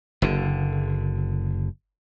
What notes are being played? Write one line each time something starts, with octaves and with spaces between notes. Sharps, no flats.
F#1 D3